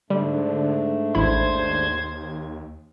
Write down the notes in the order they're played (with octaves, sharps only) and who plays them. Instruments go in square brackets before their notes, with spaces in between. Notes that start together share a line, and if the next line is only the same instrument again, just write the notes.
[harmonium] G#2 A3 D4 [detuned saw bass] D3 [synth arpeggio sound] G3
[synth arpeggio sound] A1 E4 B5 [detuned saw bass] D#2 [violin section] C5 G#6